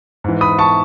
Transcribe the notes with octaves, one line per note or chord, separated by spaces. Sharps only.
G#2 E3
B5 D#6
A5 C#6